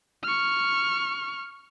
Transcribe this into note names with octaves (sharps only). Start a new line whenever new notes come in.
C#6 F6